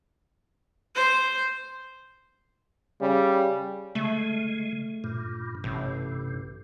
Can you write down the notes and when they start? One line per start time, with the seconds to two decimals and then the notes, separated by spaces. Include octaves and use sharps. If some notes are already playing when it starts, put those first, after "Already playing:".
0.95 C5
3.01 C#3 G3
3.95 C#3 G#3 A3
5.04 G2 A#2
5.64 A1 G2 C3